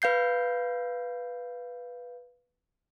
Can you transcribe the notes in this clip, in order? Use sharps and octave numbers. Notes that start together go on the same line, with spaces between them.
B4 F5 G6 C7